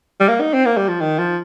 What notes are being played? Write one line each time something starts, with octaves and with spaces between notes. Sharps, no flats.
G3
A#3
D#4
C4
A#3
G3
F3
D#3
F3